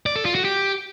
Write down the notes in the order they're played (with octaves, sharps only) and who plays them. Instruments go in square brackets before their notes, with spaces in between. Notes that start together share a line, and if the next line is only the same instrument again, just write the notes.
[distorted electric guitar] D5
A4
F4
F#4
G4